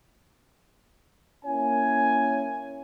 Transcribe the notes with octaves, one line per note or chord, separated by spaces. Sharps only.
A#3 C#4 E4 C#5 G#5